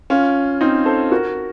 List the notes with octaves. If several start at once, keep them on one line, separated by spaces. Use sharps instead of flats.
C#4 F4
C4 D#4
A4 C5
F#4 A#4